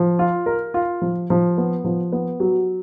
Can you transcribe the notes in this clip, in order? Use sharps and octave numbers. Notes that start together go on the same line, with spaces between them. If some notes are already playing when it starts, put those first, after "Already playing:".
Already playing: F3
F4
A#4
F4
F3
F3
B3
F3
B3
F#3